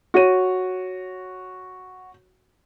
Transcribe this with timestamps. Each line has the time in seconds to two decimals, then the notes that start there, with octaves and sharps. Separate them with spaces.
0.14 F#4 C#5 D#7